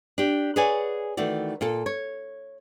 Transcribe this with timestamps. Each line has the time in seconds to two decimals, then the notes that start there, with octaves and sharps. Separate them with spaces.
0.18 D4 G4
0.56 G#4 B4 C#5 D5 F#5 G#5
1.17 D#3 E3 A3 F#4 D5
1.61 A#2 F4 A4
1.86 C#5